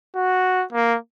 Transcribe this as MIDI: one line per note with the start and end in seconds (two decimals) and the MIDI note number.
0.15 0.64 66
0.73 0.97 58